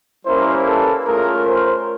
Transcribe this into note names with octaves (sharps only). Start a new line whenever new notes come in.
G3 A#3 C#4 E4 A#4 C5
A4 B4
A3 C#4 F4 G#4 A#4
A#4 C5